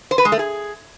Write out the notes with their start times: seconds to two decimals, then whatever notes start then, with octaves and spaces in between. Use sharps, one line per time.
0.11 C5
0.18 B4
0.25 G#3
0.32 A3
0.39 G#4